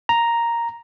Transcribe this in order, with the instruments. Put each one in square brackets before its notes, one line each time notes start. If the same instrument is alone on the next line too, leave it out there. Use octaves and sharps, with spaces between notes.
[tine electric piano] A#5